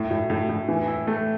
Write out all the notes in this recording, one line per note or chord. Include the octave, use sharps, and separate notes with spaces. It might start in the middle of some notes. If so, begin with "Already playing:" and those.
Already playing: A2
A2
A2
A2
E3
E4
A3